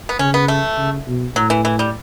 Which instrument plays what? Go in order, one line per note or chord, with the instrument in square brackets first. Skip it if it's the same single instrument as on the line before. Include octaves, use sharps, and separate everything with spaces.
[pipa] B3
[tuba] C#3 [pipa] C#4
[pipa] B3
A3
[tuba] C#3
B2
[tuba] A2 [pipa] F#3
[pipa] E3
E3
G3